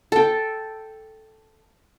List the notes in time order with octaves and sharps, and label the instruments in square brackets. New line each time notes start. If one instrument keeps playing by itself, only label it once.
[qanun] A4 G5